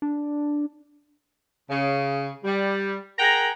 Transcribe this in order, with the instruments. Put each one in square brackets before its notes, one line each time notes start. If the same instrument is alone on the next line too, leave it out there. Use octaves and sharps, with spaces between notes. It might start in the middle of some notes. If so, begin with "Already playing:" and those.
[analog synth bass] D4
[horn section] C#3
G3
G#4 A#4 F#5 G5 A#5